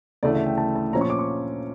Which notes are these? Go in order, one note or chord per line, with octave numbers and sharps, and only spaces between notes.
D2 C#3 E3 A3 D5
E5
G5
A5
A5
A#2 F3 C#4 A#5
C#6
D6
C#6